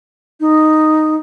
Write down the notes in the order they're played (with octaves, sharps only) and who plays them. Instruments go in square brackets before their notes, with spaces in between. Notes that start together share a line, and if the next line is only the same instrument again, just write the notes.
[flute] D#4